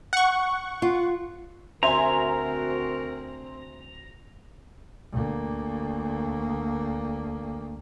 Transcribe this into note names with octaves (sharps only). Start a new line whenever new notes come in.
F#5 C#6
F4
D2 C4 F#4 A#4 C5 E5 G#5 A#5
D2 A#3